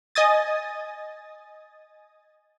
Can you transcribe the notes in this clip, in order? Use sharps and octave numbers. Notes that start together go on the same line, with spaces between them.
D#5 G#5 D#6 A6